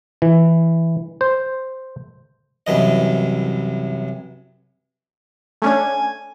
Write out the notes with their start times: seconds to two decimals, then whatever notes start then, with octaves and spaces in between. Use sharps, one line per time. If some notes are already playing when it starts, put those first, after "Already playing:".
0.22 E3
1.21 C5
2.67 C2 F#2 E3 D#5
5.62 A3 C#4 D4 G#5